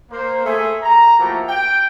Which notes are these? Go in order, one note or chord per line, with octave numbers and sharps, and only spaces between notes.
A#3 C5
A3 G#4 E5 G#5
A#5
F3 A3 A#3 E4 F#4 G4
G5